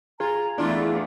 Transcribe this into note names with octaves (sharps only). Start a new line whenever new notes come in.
F4 G#4 A#5
E2 A3 D4 E4 F4